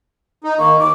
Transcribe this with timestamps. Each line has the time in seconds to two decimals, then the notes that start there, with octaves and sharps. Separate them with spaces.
0.44 D#4
0.59 D#3 A#3 C#6
0.79 D#2 D6